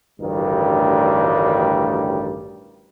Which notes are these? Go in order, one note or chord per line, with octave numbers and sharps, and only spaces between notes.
A1 D2 G2 D#3 G3